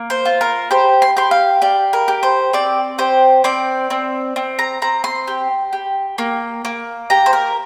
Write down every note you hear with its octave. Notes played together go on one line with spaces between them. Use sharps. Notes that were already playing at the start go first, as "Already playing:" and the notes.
Already playing: A#3
C5
F4
A#4
G4 C5
C6
G4 C6
F5
G4 D5
A#4
G4
C5
C4 D5
G4 C5
C4 D5
C4
C4
A#5
C4 A#5
C6
G4
G4
A#3
A#3
G4 A#5
C5
A#4